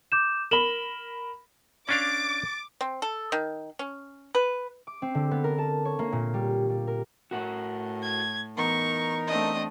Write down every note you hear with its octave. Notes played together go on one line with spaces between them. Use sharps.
D6 G6 E7
A#4 B5 E7 F#7 G7
C#4 D4 F5 D6 A6
C4
A4
D#3
C#4
B4
D6
C4
D3
B3
A#4
A5
C#5
A#3
A#2
G3
G3
A#4
A2 F#4 A#4 F#5
G#6
E2 B3 D#4 A#4 C#6
A3 C4 D4 D#5